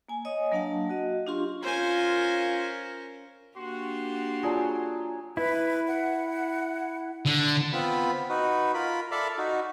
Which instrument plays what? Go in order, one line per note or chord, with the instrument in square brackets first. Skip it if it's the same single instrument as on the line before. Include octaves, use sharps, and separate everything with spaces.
[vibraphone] A#3 G#5
C#5 D#5 G#5 D#6
F#3 A#3 D4 F5 F#5 A5
F#4 D#5
D4 F4 G4 F5 C6 C#6
[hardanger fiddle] C#4 A#4 [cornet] F4 [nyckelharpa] C5 G#5
[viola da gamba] A#3 D4 G4 [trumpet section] F#4 C6
[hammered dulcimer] F#3 G#4 [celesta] F4 D5 A5
[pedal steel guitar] E4 [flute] B4
[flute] F#5
[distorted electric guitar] D3
[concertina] B3 C4 F4 B5
D#4 F#4 B4
F4 A#4 B5
A4 D5 E5 F5 A5 B5
D#4 F#4